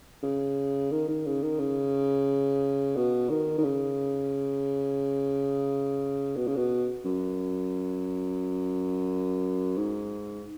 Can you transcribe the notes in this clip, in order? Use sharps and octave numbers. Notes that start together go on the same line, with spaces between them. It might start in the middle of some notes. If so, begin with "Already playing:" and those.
C#3
D#3
D#3
C#3
D#3
C#3
B2
D#3
D#3
C#3
B2
C#3
B2
F#2
G#2